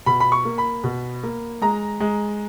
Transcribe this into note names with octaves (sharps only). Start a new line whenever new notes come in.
B2 B5
B5
C#6
A#3
B5
B2
A#3
G#3 A#5
G#3